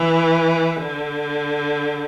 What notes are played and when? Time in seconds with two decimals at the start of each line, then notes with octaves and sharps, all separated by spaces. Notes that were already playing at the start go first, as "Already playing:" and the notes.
Already playing: E3
0.77 D3